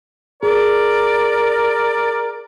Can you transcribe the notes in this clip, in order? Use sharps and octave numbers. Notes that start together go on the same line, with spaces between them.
G#4 A#4 D5